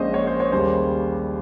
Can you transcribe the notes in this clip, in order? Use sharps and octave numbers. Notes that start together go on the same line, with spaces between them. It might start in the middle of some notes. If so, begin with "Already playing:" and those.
Already playing: A#1 A#2 G#3 C#4 C5 D#5
C#5
C5
C#5
D#2 C#3 G3 C#4 C5